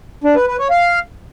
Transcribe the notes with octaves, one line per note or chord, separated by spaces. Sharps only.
D4
B4
B4
C#5
F5